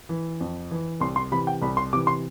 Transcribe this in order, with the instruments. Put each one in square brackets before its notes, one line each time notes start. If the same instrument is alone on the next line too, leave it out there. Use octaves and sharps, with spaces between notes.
[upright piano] E3
F2
E3
C2 C6
C6
C3 E3 B5
G5
C2 B5
C6
C3 E3 D6
C6